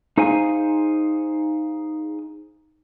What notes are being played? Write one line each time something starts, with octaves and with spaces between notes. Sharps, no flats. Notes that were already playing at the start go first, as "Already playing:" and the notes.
D#4 G#4 C5 F5 G#5